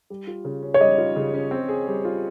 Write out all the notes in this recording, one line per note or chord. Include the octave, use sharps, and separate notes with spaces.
G3
F4
C#3
C#4
C#5
G3 D#5
F4
C#3
C#4
C4
G#4
G3
F4